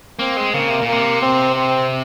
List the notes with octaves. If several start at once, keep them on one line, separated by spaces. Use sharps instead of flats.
A#3 C4
G#3
C#3 A#3
C3
A#2
C3 A#3
C4
C4